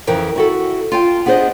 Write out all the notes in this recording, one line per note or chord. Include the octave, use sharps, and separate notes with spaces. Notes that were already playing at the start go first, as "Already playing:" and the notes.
F2 C#3 E3 A#4 G5
E4 F#4 A4
F4 G5 A5
B3 D4 G#4 A#4 C5 D#5